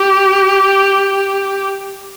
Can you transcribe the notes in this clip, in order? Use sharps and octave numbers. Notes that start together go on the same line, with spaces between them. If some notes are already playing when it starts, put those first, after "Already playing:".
Already playing: G4